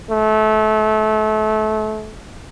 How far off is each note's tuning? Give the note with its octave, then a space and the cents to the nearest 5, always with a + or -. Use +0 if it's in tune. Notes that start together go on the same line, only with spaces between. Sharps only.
A3 -25